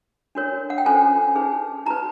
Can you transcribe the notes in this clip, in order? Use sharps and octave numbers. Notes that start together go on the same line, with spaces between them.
D4 F#4 A#4 C#5
F#5
G5
C#4 F4 A4 C5 G#5
D#4 G#4 B4
D#4 F#4 B4 A#5